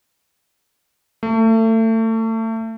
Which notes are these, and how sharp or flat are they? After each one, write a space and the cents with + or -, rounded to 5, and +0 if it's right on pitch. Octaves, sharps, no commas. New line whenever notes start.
A3 +30